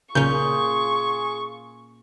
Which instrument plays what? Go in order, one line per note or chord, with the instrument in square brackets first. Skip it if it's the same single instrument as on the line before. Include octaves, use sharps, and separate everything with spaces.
[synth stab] B1 C#3 G6 [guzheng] A#2 C#4 [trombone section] F4 G#4 [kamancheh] C#6